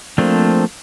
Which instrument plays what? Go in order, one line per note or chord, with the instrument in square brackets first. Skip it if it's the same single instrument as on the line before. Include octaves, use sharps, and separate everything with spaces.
[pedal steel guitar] F3 A3 A#3 C4 D4